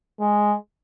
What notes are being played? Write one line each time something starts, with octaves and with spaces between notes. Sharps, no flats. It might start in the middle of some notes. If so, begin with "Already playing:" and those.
G#3